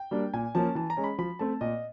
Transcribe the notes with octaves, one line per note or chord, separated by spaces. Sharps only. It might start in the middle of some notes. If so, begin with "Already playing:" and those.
Already playing: G5
G3 A#3 D4
A#2 G#5
F3 A#3 C#4 A5
E3 A5
A#5
G#3 C#4
B5
F3 B5
A3 C4 A5
A#2 D#5